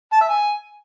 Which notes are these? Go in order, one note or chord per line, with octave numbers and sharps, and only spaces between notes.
A5
E5
G#5